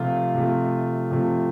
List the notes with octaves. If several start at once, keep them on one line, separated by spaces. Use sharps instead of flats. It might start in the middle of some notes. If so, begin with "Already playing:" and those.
Already playing: C3 F3 A3 F4
C3 F3 A3
C3 F3 A3